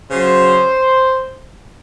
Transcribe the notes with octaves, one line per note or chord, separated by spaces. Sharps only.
C#3 F#3 C5